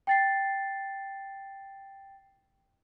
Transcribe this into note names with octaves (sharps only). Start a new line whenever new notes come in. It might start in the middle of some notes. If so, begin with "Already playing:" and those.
G5 A6 C7